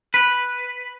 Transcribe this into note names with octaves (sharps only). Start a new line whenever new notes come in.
B4